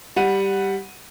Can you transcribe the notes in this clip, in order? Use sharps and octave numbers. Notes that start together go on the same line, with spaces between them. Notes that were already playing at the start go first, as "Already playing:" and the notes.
G3 F#5 D#7